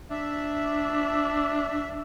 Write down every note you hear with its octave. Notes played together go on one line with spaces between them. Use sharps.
D4 E5